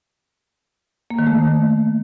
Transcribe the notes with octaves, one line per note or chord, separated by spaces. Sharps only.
A#3
D#3
A3